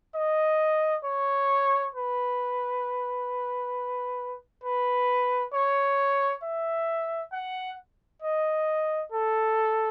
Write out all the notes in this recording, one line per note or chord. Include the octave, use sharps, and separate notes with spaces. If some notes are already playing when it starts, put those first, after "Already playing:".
D#5
C#5
B4
B4
C#5
E5
F#5
D#5
A4